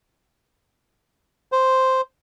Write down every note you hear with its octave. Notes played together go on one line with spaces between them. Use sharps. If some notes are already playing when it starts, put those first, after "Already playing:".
C5